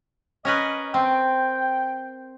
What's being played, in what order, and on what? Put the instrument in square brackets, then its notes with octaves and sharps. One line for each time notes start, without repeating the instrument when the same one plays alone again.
[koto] C#4 A#4 B4 [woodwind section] D#5
[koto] C4 [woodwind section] G5